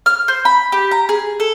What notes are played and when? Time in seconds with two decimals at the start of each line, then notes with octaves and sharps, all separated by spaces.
0.06 F6
0.28 C5
0.45 B5
0.72 G4
0.91 A#5
1.09 G#4
1.40 A4